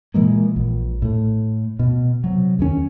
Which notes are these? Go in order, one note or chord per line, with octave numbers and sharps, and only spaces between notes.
A#2 E3 G#3 A#3
A#1
A2 A3
B2
C3 F#3
E2 D#3 C#4